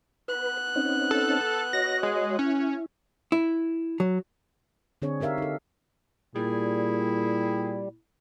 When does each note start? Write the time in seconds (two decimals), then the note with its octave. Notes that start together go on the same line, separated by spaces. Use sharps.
0.28 B3 B4 F#6
0.76 C4 C#4 D#4
1.11 A4
1.73 F#4 C#5 D#5 A#6
2.03 G#3
2.39 C#4 E4
3.32 E4
4.00 F#3
5.02 D3 C4 D4 G#4 C#5
5.20 D#4 G4 A#4 E5 F5
5.38 D#4 A4
6.35 A#2 G3 E4 G#4